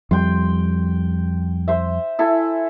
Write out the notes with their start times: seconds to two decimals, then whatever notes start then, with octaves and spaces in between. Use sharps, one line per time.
0.11 F2 G3 G5 C6
1.68 C5 E5
2.19 E4 A4 G#5